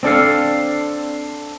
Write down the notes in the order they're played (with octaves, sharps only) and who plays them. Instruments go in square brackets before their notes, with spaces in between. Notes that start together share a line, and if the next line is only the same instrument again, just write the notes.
[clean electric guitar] C4 D4 A4 F5